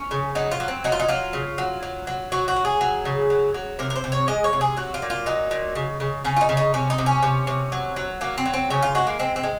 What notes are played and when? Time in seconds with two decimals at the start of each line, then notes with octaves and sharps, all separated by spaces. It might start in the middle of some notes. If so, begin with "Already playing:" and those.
Already playing: C#4
0.11 C#3
0.35 F#3 D#4
0.52 F4
0.60 F#3
0.68 C4
0.84 F#3 D#4
0.92 F4
0.99 D#4
1.08 F#3 F4
1.33 C#3
1.58 F#3
1.83 F#3
2.07 F#3
2.32 F#3 F#4
2.48 F#4
2.56 F#3
2.65 G#4
2.81 F#3
3.05 C#3
3.30 F#3
3.54 F#3
3.79 C3 A#4
3.90 A#4
3.96 C5
4.04 C3
4.12 C#5
4.28 G#3 D#5
4.44 C#5
4.53 C3
4.61 G#4
4.77 F#3 F#4
4.94 F4
5.02 A#2
5.10 F4
5.26 F#3 D#4
5.51 A#2
5.75 C#3
6.00 C#3
6.24 C#3 C#4
6.36 F4
6.41 D#4
6.49 C#3
6.57 D#4
6.74 C3 C#4
6.90 D#4
6.98 C3
7.06 C#4
7.23 C3
7.47 C3
7.72 F#3
7.96 F#3
8.21 F#3 A#3
8.38 C4
8.46 F#3
8.54 C4
8.70 C#3 C#4
8.82 F4
8.95 G#3 F#4
9.07 A#3
9.19 G#3 C4
9.36 C4
9.43 G#3